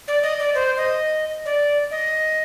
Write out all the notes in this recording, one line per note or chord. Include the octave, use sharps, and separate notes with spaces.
D5
D#5
D5
C5
D#5
D5
D#5